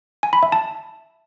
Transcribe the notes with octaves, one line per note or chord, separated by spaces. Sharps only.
G#5
B5
E5
A5